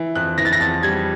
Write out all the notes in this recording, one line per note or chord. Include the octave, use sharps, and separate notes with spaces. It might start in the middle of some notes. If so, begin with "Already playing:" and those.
Already playing: E3
F2 F#6
E3 A#6
A6
A#6
F2 A6
G3 G#6